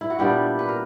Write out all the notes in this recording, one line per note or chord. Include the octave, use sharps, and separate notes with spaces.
E4
F#4
A#2 G3 B3 D4 E4 G4
B4
A#4